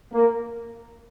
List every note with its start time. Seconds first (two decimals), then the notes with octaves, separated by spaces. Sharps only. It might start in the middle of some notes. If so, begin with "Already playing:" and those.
0.13 A#3